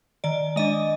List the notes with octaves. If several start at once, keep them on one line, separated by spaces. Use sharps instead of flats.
D#3 D5
G#3 D4 D#5